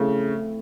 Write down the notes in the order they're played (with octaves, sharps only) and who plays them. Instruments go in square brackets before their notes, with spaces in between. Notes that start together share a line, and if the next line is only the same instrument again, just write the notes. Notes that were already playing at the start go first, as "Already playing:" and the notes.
Already playing: [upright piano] C#3 [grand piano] A3 C4 E4